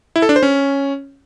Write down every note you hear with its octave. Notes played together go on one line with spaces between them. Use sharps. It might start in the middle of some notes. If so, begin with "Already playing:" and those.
E4
A4
D4
C5
C#4